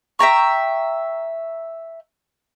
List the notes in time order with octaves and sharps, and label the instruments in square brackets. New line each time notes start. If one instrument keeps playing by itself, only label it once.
[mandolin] E5 G5 A#5 C#6